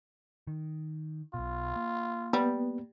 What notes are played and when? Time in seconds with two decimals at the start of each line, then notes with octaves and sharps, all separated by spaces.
0.47 D#3
1.34 B1 B2 F4
1.76 A#3
2.33 G3 B3